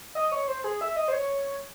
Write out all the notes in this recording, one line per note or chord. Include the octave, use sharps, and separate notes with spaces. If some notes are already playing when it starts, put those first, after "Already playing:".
D#5
C#5
C5
G#4
E5
D#5
C5
C#5